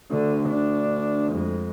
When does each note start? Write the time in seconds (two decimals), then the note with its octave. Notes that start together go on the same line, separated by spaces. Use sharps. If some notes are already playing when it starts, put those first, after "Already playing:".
0.11 D2 D3
0.49 D4
1.29 F2 G#3